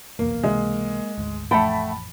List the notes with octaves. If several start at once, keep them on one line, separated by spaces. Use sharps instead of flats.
F1 B1 E2 A#3
C#2 C3 E3 G#3
G#1 D2 G#2
A1 F2 A3 F#5 G5 A5 B5